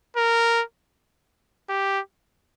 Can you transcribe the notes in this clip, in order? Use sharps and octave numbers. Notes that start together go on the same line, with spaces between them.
A#4
G4